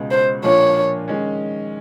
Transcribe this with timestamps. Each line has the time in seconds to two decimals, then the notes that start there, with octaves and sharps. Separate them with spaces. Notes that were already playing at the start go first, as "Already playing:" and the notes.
Already playing: C#2 B2 G#3
0.11 C5
0.44 A#2 F3 A#3 D4 F4 C#5
1.08 D#3 G#3 C#4